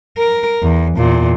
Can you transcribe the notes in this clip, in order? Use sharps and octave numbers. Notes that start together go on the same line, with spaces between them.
A#4
E2
E2 A#2